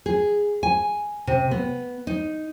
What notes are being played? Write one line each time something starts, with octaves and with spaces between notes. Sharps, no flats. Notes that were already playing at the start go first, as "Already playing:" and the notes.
G#4
G#5
C3
B3
D#4